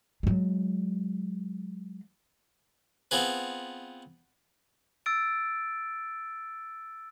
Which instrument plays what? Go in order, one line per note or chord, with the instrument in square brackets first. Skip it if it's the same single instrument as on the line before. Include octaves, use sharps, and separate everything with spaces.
[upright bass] F#3 G#3
[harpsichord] B3 C4 F4 G#4 B4
[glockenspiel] E6 A6 D7